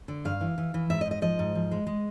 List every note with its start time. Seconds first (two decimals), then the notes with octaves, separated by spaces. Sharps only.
0.08 D3
0.25 G2 F5
0.41 E3
0.58 E3
0.74 E3
0.90 G#2 E5
1.01 D#5
1.06 G#2
1.11 D#5
1.22 F3 D#5
1.39 G#2
1.55 F3
1.71 G#3
1.87 G#3